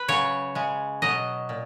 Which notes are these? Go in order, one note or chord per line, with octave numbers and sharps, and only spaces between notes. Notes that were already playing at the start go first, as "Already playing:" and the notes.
Already playing: B4
C#3 F#3 C#5
C#3 G#3
B2 F#3 D#5
A#2